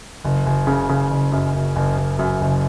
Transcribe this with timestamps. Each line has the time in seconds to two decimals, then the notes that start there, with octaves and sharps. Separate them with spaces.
0.24 F#1
0.46 F#1
0.67 C#3
0.89 C#3
1.11 F#1
1.32 F#2
1.54 F#1
1.76 F#1
1.97 F#1
2.19 F#2
2.41 F#1